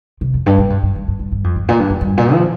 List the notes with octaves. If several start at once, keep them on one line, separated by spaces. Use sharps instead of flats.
C3
F2
G2
A#2
G2
G2
G2
G2
G2
G2
F2
G2
A#2
G2
F2
G2
A#2
F3